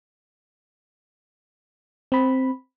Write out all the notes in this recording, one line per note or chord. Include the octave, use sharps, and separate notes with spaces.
C4 B5